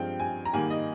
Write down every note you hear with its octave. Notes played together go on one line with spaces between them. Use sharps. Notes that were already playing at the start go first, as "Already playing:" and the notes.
Already playing: G2 F3 G#3 C4 G5
G#5
A#5
G#2 D#3 G3 A#3 G#5
D#5